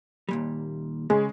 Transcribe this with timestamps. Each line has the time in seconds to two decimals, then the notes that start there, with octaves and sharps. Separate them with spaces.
0.29 D#2 A#2 G3
1.10 C#3 G#3